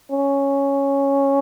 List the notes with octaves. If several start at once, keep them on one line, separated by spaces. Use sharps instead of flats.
C#4